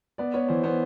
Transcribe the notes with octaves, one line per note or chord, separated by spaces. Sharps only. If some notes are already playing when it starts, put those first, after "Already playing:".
B3 D5
B3 C#5
E3 C5
B3 C5